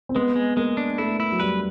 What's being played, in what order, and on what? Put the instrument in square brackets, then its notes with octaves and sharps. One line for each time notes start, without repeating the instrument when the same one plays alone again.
[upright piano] C4
[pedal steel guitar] G#3 [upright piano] B3
[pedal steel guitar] G#3
[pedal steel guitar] G#3 [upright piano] A#3
[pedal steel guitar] D4
[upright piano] A3 [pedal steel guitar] E4
[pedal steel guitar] E4
[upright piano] F#3
[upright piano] G3 [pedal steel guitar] B4